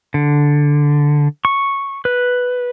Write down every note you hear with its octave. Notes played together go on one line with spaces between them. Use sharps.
D3
C#6
B4